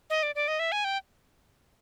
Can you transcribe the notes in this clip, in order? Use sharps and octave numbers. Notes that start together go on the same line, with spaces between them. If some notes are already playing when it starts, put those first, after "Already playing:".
D#5
D5
D5
D#5
E5
G#5
G5